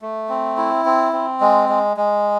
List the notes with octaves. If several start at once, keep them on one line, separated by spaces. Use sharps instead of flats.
A3
C4
E4
C4
C4
G#3
G#3
G#3